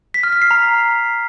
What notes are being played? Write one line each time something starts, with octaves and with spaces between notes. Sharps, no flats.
B6
F6
B6
C7
A#5